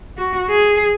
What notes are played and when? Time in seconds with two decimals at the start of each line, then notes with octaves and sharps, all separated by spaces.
0.18 F#4
0.50 G#4